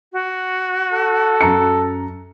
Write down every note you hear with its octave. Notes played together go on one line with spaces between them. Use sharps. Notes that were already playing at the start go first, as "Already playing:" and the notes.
F#4
A4
F#2 A#5 C#7